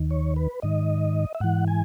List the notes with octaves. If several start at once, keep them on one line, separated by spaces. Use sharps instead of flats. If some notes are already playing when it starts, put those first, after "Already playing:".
Already playing: D#2 D#3
C#5
B4
G#2 D#3 D#5
E5
G#2 E3 F#5
G#5